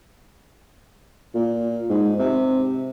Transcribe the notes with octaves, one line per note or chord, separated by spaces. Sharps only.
A#2
G#2
C3